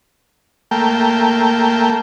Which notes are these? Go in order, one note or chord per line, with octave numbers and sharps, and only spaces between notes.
A3 A#3 G5